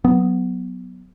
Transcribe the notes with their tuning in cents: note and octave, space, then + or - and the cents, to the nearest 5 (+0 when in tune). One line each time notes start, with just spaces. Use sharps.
F#3 -10 B3 +0